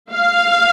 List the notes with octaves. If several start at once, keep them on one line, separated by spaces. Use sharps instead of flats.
F5